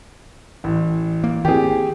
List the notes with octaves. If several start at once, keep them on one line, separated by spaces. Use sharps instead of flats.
A1
A#3
D#3 C4 G4 G#4